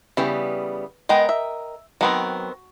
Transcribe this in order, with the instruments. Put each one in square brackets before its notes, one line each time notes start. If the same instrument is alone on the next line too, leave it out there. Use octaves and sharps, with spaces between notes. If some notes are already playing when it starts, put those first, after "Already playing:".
[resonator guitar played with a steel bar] C#3 G3 B3 [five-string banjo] E3
[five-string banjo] G#3 B3 [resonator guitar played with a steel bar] A#4 D#5 G5
[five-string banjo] E5
[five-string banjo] D#3 B3 C4 [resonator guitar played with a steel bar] F#3